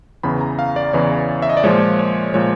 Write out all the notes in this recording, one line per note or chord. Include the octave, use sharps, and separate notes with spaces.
E2 C#3 E3 B5
A#5
F5
D5
E2 C#3 E3 C#5
E5
D#5
D5
A#2 F3 G#3 C#5
C#5
A#2 F3 G#3 C#5